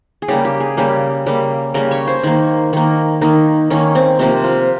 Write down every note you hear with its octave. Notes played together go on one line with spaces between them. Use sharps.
G#4
C#3 G3 A#3 G4
G4
G#4
C#3 G3 A#3 G4
C#3 G3 A#3
C#3 G3 A#3 A#4
C#5
C5
D#3 A#3
D#3 A#3
D#3 A#3 D#4
D#3 A#3 C#4
C4
C3 F3 A#3 C4
F4